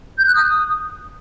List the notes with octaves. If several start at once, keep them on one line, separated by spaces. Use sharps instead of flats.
G6
F#6
D#6